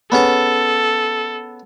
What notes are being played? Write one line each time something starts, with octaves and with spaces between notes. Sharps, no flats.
B3 C#4 G#4 A4